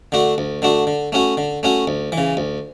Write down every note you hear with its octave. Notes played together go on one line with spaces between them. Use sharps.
D3 A3 D4 F#4
D2
D3 A3 D4 F#4
D3
A3 C#4 F#4
D3
A3 C#4 F#4
D2
E3
C#3
D2